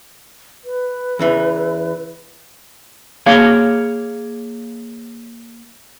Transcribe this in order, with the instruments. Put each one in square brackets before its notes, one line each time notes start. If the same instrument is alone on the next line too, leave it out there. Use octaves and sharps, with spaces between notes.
[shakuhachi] B4
[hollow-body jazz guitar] E2 C#3 E3
[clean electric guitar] A#3 G#4 C#5 F5